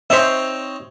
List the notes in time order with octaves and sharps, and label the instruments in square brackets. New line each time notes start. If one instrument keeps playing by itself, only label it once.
[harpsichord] C4 D#4 C#5 [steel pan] C5 E5